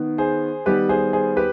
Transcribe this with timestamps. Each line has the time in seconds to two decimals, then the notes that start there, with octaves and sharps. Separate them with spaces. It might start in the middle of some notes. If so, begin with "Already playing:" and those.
Already playing: D#3 B3
0.18 G#4 C5
0.66 D#3 G3 B3 G4 B4
0.89 G#4 C5
1.13 G#4 C5
1.37 G4 B4